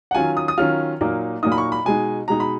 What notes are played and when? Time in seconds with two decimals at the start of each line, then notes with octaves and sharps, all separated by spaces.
0.11 F#5
0.15 D#3 F#3 C#4 F4 G#5
0.37 D#6
0.48 D#6
0.58 D#3 F#3 C#4 F4 F6
1.01 A#2 F#3 A#3 D#4
1.43 A#2 F#3 A#3 D#4 D#6
1.52 B5
1.58 C#6
1.72 B5
1.85 B2 G#3 D#4 G#5
2.28 B2 G#3 D#4 A#5
2.40 B5